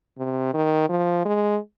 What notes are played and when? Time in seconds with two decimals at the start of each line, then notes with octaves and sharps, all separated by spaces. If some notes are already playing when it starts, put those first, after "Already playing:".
0.18 C3
0.54 D#3
0.89 F3
1.25 G#3